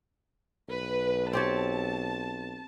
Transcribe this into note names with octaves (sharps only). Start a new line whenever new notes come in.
B1 B4
C4 G4 C#5 A5